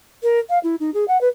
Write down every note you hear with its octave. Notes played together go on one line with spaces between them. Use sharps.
A#4
F5
E4
D#4
G#4
F#5
B4